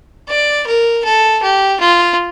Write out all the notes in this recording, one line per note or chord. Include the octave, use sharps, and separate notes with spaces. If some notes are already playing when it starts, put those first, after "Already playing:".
D5
A#4
A4
G4
F4